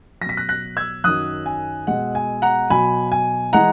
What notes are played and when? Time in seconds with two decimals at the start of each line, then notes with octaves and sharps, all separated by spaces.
0.21 F#3 A#6
0.26 B2 B6
0.37 F#6 A#6
0.49 F#6 A#6
0.77 E6 G#6
1.04 F#2 D#3 F#3 D#6 F#6
1.46 G#5
1.87 B2 G#3 F#5
2.15 G#5
2.42 F#5 A#5
2.70 B2 F#3 G#5 B5
3.12 G#5
3.53 E3 G#3 F#5 A#5